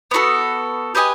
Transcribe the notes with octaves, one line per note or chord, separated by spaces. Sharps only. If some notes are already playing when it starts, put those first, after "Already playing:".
B3 D#4 F#4 A4
G4 B4 D#5 G#5